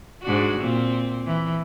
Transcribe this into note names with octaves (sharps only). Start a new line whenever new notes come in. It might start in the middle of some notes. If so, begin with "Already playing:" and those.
G#2 D4 F#4
A#2 C4
E3